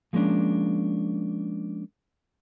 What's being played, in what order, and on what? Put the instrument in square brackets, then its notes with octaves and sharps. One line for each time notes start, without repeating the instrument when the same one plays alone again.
[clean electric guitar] F3 G#3 A#3 C#4 D4